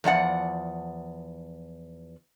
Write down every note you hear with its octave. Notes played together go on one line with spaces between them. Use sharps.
E2 F3 D5 F#5